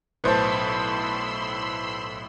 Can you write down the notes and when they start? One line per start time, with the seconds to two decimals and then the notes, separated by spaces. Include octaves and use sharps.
0.24 B1 A2 B4 C5 A5 B5 C6 E6